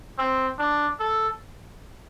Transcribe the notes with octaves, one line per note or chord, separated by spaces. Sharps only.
C4
D4
A4